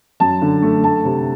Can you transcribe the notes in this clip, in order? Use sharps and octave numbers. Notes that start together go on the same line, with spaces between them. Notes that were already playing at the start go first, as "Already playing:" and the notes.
F#2 A5
D3
A3
A3 A5
C3